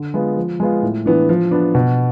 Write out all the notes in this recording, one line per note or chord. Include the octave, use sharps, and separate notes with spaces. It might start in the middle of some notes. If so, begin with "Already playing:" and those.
Already playing: D3
G#3 B3 F4
F3
G#3 B3 F4
A2
E3 B3 D4
F3
B3 D4
B2